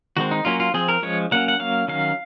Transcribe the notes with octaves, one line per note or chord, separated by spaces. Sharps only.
D#3 G#3 C4 F#4
D#4
F#3 A#3 C#4 F4
F4
F3 C4 G#4
A#4
F3 G#3 C#4 C#5
F#3 A#3 C#4 F#5
F#5
F#3 A#3 C#4 F5
D#3 F#3 C#4 F5